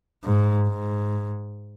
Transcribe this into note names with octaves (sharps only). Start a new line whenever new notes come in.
G#2
G#2